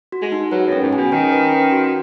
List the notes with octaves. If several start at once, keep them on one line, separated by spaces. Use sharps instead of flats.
F#4
G#3
D#4
F#3 B4
F#2
C#4
G#2
B2 G#5
D#3 C#4
B4
C#4
F#4